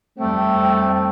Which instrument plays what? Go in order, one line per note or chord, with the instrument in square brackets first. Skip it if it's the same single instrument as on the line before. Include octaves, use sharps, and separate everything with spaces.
[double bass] F2 G3 [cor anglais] A3 [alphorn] C4 [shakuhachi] G5